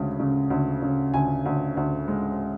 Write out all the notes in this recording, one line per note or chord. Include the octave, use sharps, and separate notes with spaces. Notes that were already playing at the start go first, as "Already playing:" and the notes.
Already playing: D2 C#3 G#3
C#3
D2
C#3
D2 G#5
D2
D2
G#3